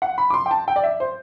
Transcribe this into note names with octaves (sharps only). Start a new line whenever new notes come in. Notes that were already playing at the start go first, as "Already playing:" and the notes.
F#5
B5
D6
C6
G5
A5
G5
D5
E5
C5